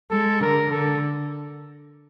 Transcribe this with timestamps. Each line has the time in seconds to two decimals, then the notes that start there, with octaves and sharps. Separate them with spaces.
0.10 G#3 A4
0.40 D3 A#4
0.71 D3 A4